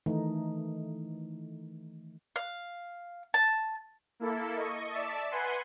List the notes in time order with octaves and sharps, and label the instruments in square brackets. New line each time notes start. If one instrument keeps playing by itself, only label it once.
[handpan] D#3 E3 A3 D#4
[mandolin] F5
A5
[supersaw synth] A#3 E4 A4
D#5 C#6
D5 E5 A5
B4 F#5 G#5 C6